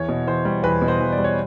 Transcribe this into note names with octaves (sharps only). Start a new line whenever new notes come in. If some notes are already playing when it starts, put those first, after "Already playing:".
Already playing: E2 C#5
B2
E2 C5
G3
E2 B4
B2
C5
E2
D5
G3
C#5